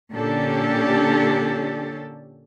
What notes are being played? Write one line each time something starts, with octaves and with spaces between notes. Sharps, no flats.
A#2 D3 C#4 D4 G4 A4